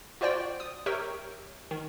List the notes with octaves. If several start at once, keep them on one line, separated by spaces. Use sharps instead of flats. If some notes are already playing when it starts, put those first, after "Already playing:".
F4 F#4 C5 D5 G5
D#6
G4 A#4 C#5 E5 G5
D#3